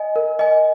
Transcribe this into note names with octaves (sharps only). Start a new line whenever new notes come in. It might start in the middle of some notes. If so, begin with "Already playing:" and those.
Already playing: D#5 G#5
A#4
D#5 G#5